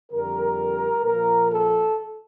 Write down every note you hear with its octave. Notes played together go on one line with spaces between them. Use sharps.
F2 D3 G3 A#4
A#2 F3 A#4
A4